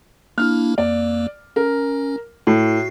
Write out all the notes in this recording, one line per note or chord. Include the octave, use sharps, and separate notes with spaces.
A#3 D4 E4 F6
F2 A#3 D5
C#4 A#4
A2 F#4 C7